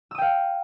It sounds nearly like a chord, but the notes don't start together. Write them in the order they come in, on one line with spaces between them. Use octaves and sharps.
E6 D#6 G5 F5